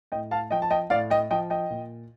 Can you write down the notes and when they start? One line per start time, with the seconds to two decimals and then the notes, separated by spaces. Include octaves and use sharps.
0.12 A2 D#5 G5
0.31 F5 A5
0.51 F3 D#5 G5
0.62 A5
0.70 D#5 G5
0.90 A2 D5 F5
1.10 D#5 G5
1.31 F3 D#5 G5
1.50 D#5 G5
1.70 A#2